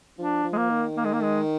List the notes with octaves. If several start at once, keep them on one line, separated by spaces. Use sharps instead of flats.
F3 D4
F3
G#3
A#3
D#3
A#3
G#3
A#3
G#3